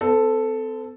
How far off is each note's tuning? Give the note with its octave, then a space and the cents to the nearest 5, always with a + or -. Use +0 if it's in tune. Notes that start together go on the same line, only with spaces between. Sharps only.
C4 -40 A4 +0